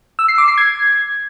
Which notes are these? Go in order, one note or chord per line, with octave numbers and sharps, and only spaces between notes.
E6
C7
D6
C7
G#6